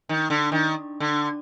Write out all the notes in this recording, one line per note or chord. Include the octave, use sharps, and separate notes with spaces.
D#3
D3
D#3
D3